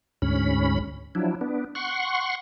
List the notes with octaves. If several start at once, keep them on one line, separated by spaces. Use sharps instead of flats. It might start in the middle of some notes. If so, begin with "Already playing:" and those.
D2 G#2 C#4 B5
F3 F#3 D4 E4
B3 D4
F#5 C6 C#6